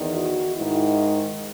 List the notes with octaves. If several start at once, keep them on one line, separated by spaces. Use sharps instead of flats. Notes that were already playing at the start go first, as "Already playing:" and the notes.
Already playing: E2 D#3
F#4
G#2 D#3 E4